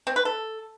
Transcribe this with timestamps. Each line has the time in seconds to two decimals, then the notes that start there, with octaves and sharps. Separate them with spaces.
0.07 C4
0.16 B4
0.25 A4